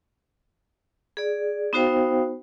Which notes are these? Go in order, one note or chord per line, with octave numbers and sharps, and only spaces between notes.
G#4 D5
B3 D#4 F#4 C5 F5 G5